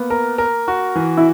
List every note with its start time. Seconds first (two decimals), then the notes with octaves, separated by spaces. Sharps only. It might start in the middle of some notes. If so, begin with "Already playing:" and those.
Already playing: A#3 B3
0.10 A#4
0.38 A#4
0.68 F#4
0.96 E3
1.17 E4